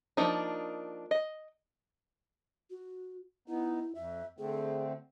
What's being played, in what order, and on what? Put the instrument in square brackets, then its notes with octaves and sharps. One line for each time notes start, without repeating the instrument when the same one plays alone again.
[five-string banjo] F3 A#3 D4 D#4
D#5
[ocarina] F#4
[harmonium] B3 D#4 [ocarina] E4
[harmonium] F2 [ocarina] E5
[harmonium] D3 A3 C4 [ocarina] G#4